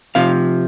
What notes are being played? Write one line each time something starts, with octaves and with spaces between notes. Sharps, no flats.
C3 F3 F5